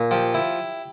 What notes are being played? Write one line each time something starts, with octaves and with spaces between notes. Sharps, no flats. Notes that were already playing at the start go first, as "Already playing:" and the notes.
Already playing: A#2
F3 G4
E4